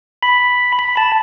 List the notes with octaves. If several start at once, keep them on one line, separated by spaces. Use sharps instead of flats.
B5
B5
A5